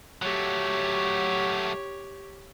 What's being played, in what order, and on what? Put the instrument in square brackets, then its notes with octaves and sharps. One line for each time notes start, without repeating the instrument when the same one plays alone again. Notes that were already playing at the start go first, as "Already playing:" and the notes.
[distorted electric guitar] F#3 A3 [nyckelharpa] G4 C#5